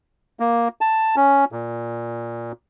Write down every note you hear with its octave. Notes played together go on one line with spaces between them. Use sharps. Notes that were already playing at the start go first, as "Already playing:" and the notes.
A#3
A5
C#4
A#2